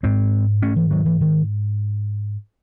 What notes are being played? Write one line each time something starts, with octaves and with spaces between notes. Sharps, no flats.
G#2 G#3 C4
A3 C#4
E3
D#3 F#3
E3
D#3